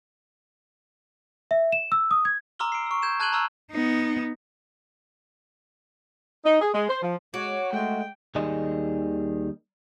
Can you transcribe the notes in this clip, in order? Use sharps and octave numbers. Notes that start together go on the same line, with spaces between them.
E5
E7
E6
D#6
G#6
A#5 C6 D6 E6 F6 G7
C7 D7
C#6 E6
G6 G#6 E7
A5 F#6 G#6 D#7 F#7 G7
A#5 C#6 E6 F6
B3 D#4
D#4
G#4
G#3
C5
F3
G#3 F#4 C#5 D6
G#3 A3 G5
D#2 D#3 G3 G#4 D#5